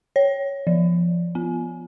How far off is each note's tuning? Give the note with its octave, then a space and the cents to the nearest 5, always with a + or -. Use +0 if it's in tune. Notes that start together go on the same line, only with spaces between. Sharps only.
C#5 +0
F3 -15
B3 +0